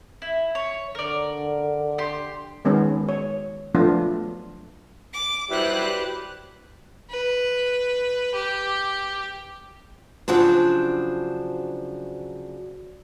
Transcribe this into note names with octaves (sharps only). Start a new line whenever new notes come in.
E4
C#5
D3 A#4 D5
G4 C6
D#3 G#3 B3 C#4
C#5
F3 F#3 A3 B3 D4 F4
D6
F#3 G3 E4 G4 B4 C5 F#6
B4
G4
C#3 F3 F#3 D4 C5